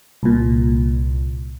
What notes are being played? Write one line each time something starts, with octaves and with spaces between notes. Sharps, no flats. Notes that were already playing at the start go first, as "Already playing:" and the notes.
C2 A#2